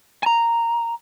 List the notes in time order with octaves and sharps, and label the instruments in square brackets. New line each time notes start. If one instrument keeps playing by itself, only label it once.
[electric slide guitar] G#5 A#5